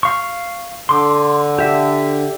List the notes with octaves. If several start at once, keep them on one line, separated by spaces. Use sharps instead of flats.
F5 C#6
D3 C6 D6
G4 E5